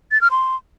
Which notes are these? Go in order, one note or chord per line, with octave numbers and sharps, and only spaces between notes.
A6
F6
C6